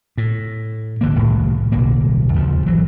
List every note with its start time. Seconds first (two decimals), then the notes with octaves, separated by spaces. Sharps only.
0.18 A2
1.01 G#1 D3 A#3
1.15 D#1 C2 A2 D#3
1.72 D1 B1 A#3
2.34 D#2 C#3 F3
2.66 G#1 E3 F#3